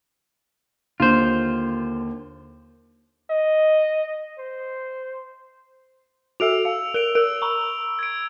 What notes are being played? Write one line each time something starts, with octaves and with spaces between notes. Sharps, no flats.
D#2 D3 F4 C5
D#5
C5
F#4 A4 E5 E6 D7 F7
F5
A#4 D7 F7 G7
A#4 E6 D7
A#5 B5 C#6
G#6 D7